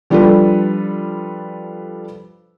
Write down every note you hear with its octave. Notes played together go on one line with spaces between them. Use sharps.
F3 G3 D4 F4 A4 B4